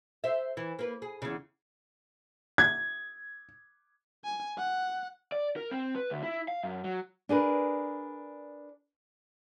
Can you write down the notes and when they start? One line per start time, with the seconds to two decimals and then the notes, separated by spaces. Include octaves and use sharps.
0.24 C5 E5
0.57 E3
0.79 A#3 B4
1.02 G#4
1.22 E2 C#3
2.58 G#6
4.24 G#5
4.57 F#5
5.32 D5
5.56 A#4
5.71 C4
5.95 B4
6.10 D2
6.24 E4
6.48 F5
6.63 F#2
6.84 F#3
7.29 D4 G#4 A#4 B4